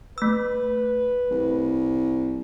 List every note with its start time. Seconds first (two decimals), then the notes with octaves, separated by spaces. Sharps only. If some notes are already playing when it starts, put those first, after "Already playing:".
0.18 A3 B4 E6
1.31 C2